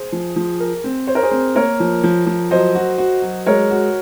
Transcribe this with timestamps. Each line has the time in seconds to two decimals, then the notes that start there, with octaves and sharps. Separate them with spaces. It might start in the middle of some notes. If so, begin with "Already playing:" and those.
Already playing: G#4 C5
0.12 F3
0.36 F3
0.60 A#4
0.84 C4
1.07 C5 C#5
1.15 A#4
1.23 G#4 C5
1.31 C4
1.56 A#3 A#4 C#5
1.80 F3
2.04 F3
2.27 F3
2.50 F#3 C5 D#5
2.75 F#4
2.98 F#4
3.22 F#3
3.46 G#3 A#4 C#5
3.71 F#4